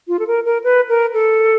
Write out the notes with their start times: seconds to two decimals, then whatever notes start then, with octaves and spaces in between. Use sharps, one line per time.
0.08 F4
0.19 A4
0.27 A#4
0.45 A#4
0.64 B4
0.89 A#4
1.14 A4